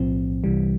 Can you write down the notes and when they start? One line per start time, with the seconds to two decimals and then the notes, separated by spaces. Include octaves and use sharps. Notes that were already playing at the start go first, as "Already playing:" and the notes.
Already playing: B1 A2 F3 C4
0.44 C2 C3 E3 G3